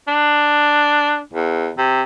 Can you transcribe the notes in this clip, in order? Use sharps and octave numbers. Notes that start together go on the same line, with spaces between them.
D4
E2
C3